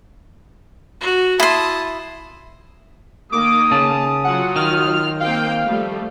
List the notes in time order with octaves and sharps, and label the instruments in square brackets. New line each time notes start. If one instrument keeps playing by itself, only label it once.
[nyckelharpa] F#4
[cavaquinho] E4 C6 [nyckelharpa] A5 D#6
[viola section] D#3 A#3 [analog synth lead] D6 [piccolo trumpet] D#6
[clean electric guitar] C#3 [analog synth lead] A5
[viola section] F#3 F4 [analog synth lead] F#5
[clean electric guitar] D#3 [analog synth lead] F6
[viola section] A#3 C4 G5 [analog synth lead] F5
[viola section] F3 G3 A3